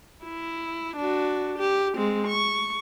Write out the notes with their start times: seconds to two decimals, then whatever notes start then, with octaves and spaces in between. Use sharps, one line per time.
0.23 E4
0.97 D4 F#4
1.58 G4
1.95 G#3 C4
2.27 C#6